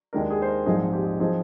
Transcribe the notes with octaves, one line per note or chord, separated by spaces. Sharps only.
D#2 D#3 G#3 D4 A#4
G#4
C5
A#4
A#1 G#2 F3 C4 D#4 G#4
G4
F3 C4 D#4 G#4